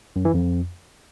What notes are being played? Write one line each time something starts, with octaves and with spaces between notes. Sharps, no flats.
F#2
E3
F2